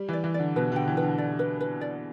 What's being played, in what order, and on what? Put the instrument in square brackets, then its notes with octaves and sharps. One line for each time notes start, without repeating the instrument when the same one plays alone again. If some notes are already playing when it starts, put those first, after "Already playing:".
Already playing: [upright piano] G3
[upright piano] E3 [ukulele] D5
[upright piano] E3
[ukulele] D5
[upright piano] D3
[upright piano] B2 [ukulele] B4
[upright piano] D3 [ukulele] G5
[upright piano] E3
[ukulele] B4
[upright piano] D3
[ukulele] D5
B4
B4
D5